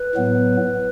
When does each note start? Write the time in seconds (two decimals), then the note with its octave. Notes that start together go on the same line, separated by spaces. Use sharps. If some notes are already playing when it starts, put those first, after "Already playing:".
Already playing: B4
0.15 A2 F#3 B3